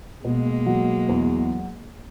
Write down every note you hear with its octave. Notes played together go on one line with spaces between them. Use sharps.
B2 G#3 A#3
F#3
E2